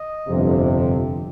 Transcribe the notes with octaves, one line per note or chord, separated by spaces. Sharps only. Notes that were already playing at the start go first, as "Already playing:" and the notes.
Already playing: D#5
G1 F2 C3